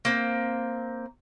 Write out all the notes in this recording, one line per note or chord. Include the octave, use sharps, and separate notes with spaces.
A#3 C4